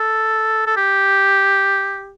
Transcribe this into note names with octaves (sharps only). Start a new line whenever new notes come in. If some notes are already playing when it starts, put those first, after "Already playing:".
Already playing: A4
A4
G4